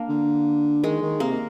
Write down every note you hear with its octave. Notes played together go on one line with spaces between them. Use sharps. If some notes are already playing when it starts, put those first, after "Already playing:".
Already playing: A#3 D4
D3
D#3 G#3
D#3
C3 A#3